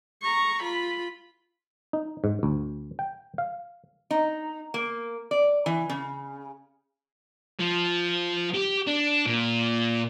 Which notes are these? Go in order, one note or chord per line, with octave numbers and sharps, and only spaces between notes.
A#5 C#6
F4 B5
D#4
G#2
D2
G5
F5
D#4
A#3
D5
E3
C#3
F3
G4
D4
A#2